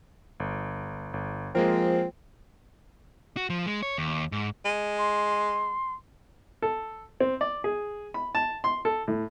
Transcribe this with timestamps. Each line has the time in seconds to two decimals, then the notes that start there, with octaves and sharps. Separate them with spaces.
0.40 G1
1.14 G1
1.55 F3 G#3 A#3 C4 A#4
3.37 F#4
3.50 F3
3.66 G#3
3.83 C#5
3.98 D#2
4.32 G#2
4.65 G#3
4.98 C6
6.62 A4
7.20 C4
7.41 D5
7.64 G#4
8.14 B5
8.35 A5
8.64 C6
8.85 A4
9.08 A2